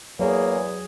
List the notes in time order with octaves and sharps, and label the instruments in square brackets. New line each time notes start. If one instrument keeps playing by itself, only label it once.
[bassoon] E2 [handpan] F#3 G#4 [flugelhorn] A#3 [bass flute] C#5